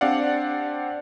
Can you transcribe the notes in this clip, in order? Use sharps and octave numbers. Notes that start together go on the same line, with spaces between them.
C4 D4 G4 D5 F5 F#5